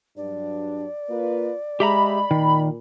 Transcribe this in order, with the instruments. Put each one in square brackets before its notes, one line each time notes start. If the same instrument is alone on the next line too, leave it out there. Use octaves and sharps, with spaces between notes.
[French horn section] G2 F#3 D4 [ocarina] D5
[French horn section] A#3 F4 B4
[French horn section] G#3 [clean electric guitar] G4 E5 A#5 [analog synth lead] B5
[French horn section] A#2 [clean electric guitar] D#3